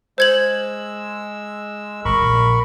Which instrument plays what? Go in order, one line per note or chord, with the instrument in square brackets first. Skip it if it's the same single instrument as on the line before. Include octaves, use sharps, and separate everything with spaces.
[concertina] G#3 E6 [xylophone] C5 G#6 F#7
[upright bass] G#1 G#2 [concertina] A#4 B5 C#6
[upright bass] A#1